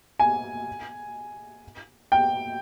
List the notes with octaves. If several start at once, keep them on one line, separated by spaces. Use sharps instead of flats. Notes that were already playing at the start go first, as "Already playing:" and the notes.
G#5
G5